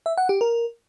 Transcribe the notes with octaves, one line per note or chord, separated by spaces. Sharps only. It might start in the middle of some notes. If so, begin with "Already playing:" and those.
E5
F#5
G4
A#4